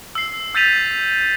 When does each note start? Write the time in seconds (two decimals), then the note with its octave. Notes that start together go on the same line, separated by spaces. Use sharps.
0.15 E6 C7
0.55 E6 G6 A6 B6 D#7 F7